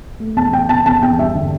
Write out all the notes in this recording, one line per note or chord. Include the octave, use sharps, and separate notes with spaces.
A3
E2 A5
E2 G5
E2 A5
E2 A5
E2 G5
G2 E5
D3